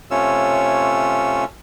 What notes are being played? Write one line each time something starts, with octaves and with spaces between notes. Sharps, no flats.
C3 A3 C#4 F4 C#5 E6